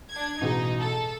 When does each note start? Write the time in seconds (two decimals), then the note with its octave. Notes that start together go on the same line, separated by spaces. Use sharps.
0.11 D4 G#6
0.41 A1 B2 D#4 G#4
0.79 A4